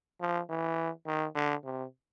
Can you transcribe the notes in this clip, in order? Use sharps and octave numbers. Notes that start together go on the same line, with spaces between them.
F3
E3
D#3
D3
C3